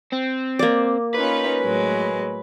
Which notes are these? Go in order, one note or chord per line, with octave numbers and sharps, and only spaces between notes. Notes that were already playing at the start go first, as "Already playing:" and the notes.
C4
A#3 D5
C#4 D#4 F4 B4
A2 F#3 G#3